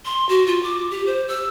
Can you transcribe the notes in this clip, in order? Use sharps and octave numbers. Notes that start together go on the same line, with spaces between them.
C6
F#4
F4
D6
G4
C5
E6